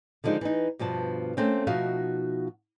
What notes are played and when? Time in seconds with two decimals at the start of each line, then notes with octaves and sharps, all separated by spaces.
0.24 D3 D#3 F3 G#3 D#4
0.41 E3 D#4
0.79 G2 B2 F3 A5
1.37 A3 A#3 C4 C#4
1.67 B2 F3 D#4 F#4 E5 F5